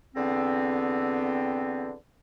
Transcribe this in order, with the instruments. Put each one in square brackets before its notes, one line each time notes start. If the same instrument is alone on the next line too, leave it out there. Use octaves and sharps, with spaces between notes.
[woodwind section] E2 D3 B3 C4